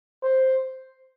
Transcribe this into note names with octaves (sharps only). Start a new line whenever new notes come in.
C5